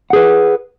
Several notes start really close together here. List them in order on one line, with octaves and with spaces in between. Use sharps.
F#5 G#4 B4